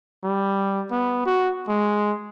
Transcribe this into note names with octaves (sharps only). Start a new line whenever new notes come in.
G3
B3
F#4
G#3